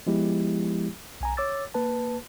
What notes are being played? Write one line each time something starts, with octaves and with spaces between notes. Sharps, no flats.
F3 G#3 B3 E4 G4
B1 G#5 A#5
C#5 D6 E6 A6
A#3 B4 A5